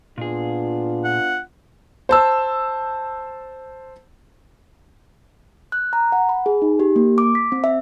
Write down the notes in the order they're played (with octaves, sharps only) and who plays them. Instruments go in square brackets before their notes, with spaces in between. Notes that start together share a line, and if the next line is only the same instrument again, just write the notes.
[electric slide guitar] A#2 G#4 [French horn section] B3 D4 F4
[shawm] F#5
[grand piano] C5 A5 E6
[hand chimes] F#6
A#5
F#5
B5
G#4
D#4
G4
A#3
D6
B6
C4
E5